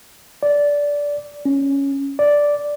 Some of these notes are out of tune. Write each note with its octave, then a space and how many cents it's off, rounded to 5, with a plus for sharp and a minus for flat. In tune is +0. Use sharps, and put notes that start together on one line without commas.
D5 -15
C#4 +0
D5 -5